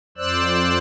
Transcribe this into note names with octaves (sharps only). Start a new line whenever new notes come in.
F2 C5 D5 E6 F#6